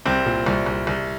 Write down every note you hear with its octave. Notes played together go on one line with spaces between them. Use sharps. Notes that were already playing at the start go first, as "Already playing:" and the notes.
C2 C4
A#2
C2
C2
C2